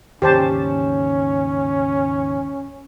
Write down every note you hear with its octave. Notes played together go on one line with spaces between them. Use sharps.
D#2 G#2 C#3 C#4 G4 C5 A5